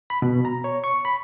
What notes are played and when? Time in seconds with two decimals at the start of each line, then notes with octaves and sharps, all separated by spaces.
0.10 B5
0.22 B2
0.45 A#5
0.64 C#5
0.84 C#6
1.05 B5